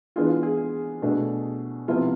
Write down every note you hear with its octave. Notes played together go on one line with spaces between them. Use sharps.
E3 B3 D4 F4 G#4
F4
G#4
B2 A3 D4
C3 F3 B3 E4 F4